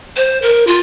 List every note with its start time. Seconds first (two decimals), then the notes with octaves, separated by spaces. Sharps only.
0.16 C5
0.42 A#4
0.67 F4